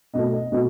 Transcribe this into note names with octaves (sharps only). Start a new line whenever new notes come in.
B2 F#3 A3 D#5
D#5
B2 F#3 A3 D#5